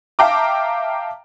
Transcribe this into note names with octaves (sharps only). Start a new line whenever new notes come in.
E5 F5 G5 A5 A#5 D6